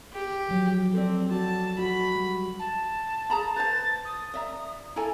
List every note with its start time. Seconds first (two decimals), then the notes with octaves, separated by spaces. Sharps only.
0.13 G4
0.49 F3 F#3
0.94 C4 A4 D5
1.31 F#4 A5
1.79 F#4 B5
2.16 G3
2.60 A5
3.30 G#4 A#5 B5
3.56 B4 C5 A5 A6
4.05 D#6
4.34 D5 E5 A#5
4.96 E4 A4 G#5 A#5